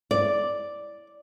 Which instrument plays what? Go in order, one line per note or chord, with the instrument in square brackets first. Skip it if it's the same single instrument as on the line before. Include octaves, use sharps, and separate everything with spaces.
[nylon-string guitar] D5